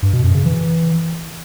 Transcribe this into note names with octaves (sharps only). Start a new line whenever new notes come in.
G2
B2
F#2
C#3
E3